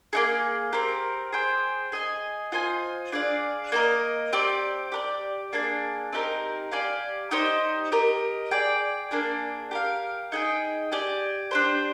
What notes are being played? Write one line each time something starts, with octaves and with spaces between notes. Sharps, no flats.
A#3 D#4 G#4
C4 G4 A#4
G#4 C5 G5
G#4 D#5 G#5
F4 C5 D#5 G#5
D4 G#4 D5 F5
A#3 F4 A#4 D#5
C4 G4 D5
G4 A#4 D5
A#3 D4 G#4
C4 D#4 G4 A#4
G4 D5 F5 G#5
D#4 G4 C5 D#5
G4 A#4 D#5
G#4 D5 G5
A#3 D4 G#4 D5
G4 A#4 F5
D#4 G#4 D#5 G5
G4 D5 G#5
D4 G4 C5